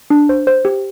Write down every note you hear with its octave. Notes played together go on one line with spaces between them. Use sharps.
D4
C5
C5
G4